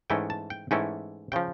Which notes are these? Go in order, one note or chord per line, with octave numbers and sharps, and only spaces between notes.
G#2 E3 A3 C#4 E4 G5
A5
G5
G#2 E3 A3 C#4 E4 G5
C#3 F3 G5